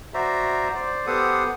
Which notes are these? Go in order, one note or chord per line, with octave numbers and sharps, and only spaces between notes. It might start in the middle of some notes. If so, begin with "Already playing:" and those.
F#4 C5 D5 E5 A#5
C5 D5
B3 G4 A4 C5 F#5 D#6